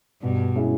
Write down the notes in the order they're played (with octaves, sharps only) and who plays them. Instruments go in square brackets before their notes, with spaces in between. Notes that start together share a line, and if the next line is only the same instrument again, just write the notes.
[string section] G2 [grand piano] B2
[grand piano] G#3 C#4 E4